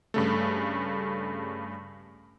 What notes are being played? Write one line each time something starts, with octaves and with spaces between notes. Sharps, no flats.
G2 C#3 A3